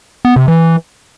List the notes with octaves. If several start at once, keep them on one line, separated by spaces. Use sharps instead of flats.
B3
C3
E3